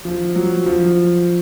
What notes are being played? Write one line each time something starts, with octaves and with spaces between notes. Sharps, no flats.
F3
F#3
F3